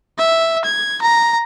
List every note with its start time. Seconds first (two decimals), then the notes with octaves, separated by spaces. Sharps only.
0.18 E5
0.64 G#6
1.01 A#5